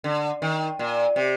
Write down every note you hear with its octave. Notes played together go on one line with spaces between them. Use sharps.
D3
D#3
A#2
C3